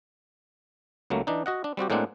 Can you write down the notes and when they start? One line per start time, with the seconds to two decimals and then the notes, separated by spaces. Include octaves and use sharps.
1.10 C#2 F#3 A3 A#3
1.27 E3 D4 D#4
1.46 F#4 D#5 F#5
1.64 D4
1.77 G3 C4 F#4 G4
1.90 A2 G#3 A#3 C4 D4 F#5